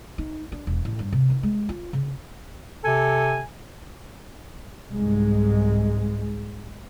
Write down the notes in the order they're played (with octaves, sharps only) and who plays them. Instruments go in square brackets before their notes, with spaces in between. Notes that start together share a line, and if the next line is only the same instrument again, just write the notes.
[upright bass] D#4
D4
E1
A1
G2
C3
D#3
G#3
F4
C#3
[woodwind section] C3 A4 G#5
[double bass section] C2 G#2 G#3